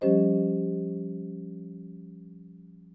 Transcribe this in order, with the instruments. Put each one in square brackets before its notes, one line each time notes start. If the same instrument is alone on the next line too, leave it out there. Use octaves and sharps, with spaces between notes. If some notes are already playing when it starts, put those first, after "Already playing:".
[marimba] F3 G3 C#4 G4 C5 D#5